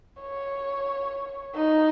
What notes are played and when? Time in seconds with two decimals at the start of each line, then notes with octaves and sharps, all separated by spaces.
0.22 C#5
1.55 D#4